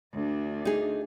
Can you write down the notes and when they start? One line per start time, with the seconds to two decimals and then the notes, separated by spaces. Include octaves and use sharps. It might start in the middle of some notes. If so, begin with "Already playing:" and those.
0.13 D2 D4
0.65 D#4 G#4